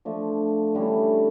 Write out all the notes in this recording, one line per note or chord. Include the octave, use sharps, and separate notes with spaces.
F3 A3 D4
D3 G3 C#4 E4